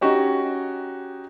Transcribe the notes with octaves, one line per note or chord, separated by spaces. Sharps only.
C#4 D#4 F#4 G4 C#5